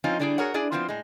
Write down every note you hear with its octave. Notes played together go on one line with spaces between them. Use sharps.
F3 C4 C#4 D#4 F4
D3 G3 D4 E4 F4 G#4
F#4 G#4 A#4 C#5 F#5
D4 E4 G#4 D5
F3 A3 B3 C4 E4 F4
A2 G#3